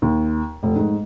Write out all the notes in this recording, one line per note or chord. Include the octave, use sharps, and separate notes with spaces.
D#2
F1
G#2